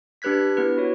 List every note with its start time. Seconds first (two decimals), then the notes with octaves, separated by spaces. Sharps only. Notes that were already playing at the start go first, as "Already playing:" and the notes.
0.22 D4 G4 B4 F#6 G#6 B6
0.57 B3 E4 B4
0.77 E4 F#4 C#5